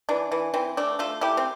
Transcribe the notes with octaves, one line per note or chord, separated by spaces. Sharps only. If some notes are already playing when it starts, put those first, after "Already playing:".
E3 D4
E3
E3 C4
A3 D4
A3 F4 A4
A3 E4 G4
C4